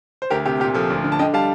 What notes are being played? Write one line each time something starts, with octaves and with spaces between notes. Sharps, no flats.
C5
D2 G4 A#4
C3 G4
A#2 G4
F3 A4
D2
D3
A5
D3 D#5 G5
G3 F5 A5